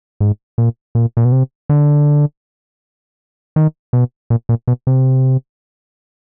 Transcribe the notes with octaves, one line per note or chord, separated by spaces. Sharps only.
G#2
A#2
A#2
A#2
B2
C3
D3
D#3
B2
A#2
A#2
B2
C3